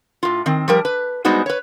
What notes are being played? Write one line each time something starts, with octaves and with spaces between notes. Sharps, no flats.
A2 F4
D#3 C4
F3 G3 A#4
B4
G3 G#3 B3 D#4 F#4 C5
B4 C#5